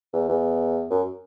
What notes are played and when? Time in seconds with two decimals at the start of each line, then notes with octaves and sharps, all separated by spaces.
0.13 E2
0.29 E2
0.90 F#2